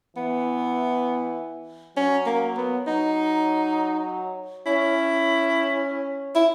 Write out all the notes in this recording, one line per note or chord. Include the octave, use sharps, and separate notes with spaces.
E3 B3
F#3 C#4
A#3
B3
F#3 D#4
C#4 E4
E4